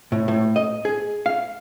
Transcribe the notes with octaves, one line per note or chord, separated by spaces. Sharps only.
A2
A2
D#5
G#4
F5